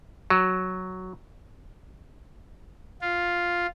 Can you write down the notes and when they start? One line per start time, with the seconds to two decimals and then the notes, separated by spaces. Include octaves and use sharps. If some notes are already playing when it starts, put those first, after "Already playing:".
0.30 F#3
3.01 F4